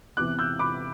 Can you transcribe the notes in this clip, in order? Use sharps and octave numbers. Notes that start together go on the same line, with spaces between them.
E2 C3 E3 D6 F#6
E6 G6
B5 D6